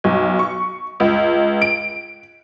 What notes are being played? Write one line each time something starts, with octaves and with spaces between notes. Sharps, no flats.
B1
C#6
C#2
D7